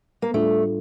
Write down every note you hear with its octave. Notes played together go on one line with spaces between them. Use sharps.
A#3
A2 G3 A3 D4 F4